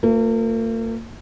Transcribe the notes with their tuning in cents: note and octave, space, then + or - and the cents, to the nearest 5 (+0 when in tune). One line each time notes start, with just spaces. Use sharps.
A#3 -45 F4 +20 B4 +0